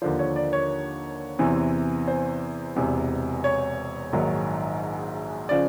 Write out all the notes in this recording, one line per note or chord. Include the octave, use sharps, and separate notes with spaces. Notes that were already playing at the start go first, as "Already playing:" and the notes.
D#2 D3 F3 C5
C#5
D5
C#5
E2 C3 E3
C5
E1 E2 C3
C#5
A#1 G#2 D#3 F#3
C#3 F3 D5